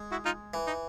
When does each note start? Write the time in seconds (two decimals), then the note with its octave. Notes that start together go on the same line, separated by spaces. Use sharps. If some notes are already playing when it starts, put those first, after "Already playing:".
Already playing: G#3
0.11 E4 F#4
0.25 D#4 F4
0.54 E3
0.67 D#4